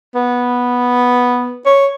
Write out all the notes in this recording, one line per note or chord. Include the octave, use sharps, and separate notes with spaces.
B3
C#5